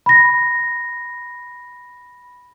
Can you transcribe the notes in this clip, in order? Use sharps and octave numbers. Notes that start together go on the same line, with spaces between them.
B5 A#6